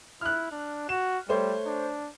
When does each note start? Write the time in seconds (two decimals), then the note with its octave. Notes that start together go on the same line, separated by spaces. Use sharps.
0.21 E4 F6 F#6
0.52 D4
0.89 F#4 E7
1.29 G3 A3 C5 C#5
1.66 D4